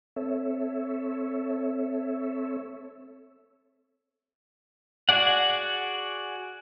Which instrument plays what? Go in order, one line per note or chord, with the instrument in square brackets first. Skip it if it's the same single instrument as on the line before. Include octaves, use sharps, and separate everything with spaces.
[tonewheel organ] C4 A4 C#5 E5
[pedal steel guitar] F#4 G#4 D5 F#5